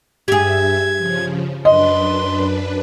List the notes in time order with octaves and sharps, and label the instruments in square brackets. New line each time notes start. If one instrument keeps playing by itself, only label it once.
[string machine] G2 E5 [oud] G4 G#4 [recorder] G#6
[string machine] C#3 F3
[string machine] F#2 D4 B4 [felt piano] D#5 [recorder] C6